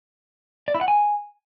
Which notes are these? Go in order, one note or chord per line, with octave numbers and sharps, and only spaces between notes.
D5
E4
F#5
G#5